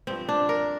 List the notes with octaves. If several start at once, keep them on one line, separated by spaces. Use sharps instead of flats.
G2 F3 C4
D4
A#4